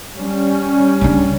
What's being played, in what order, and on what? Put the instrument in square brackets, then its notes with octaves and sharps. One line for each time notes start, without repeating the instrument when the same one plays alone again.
[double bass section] G3 C#4
[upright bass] C#3 D4